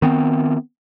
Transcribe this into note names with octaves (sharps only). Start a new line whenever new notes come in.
D#3 B3 C4